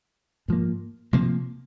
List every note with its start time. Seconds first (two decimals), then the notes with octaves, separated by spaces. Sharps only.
0.48 G#2 F3 A#3
1.13 C3 F3 A#3